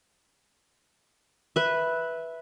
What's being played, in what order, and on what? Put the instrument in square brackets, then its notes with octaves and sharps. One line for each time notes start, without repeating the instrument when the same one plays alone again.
[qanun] B4 E5